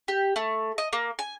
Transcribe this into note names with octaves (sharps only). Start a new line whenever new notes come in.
G4
A3
D#5
A#3
G#5